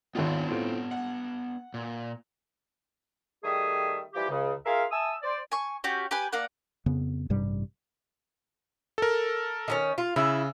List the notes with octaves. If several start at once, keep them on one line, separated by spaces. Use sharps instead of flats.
G#1 D#2 B3 D4 F4 G5
A2 C4 F4
F#5
A#2
D#3 G3 A3 G#4 E5 D#6
E3 F3 G3 G4
C#2 C#3
F4 G#4 A#4 E5 F5
E5 G#5 A5 D#6 E6
C5 D5
G#5 C#6
C#4 F#4 G4
G4 B4 G#5
A#3 D5 F#5
F2 C#3 B3
A1 G2 C3 G3
A4 A#4
D#3 A3 C#4
F4
C#3 E4